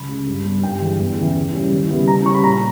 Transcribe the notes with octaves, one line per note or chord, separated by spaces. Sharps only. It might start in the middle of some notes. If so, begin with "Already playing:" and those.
Already playing: C#2 B5
C#3 G#3
G2
G3 B3
G2 G5
E3 G#3
E2
C#3 E3
C#3
G3 C#4 E4
D#2
C#3 G3 B3 E4
C#3 A#5
G3 C#4 C#6
B5
A#2 A#5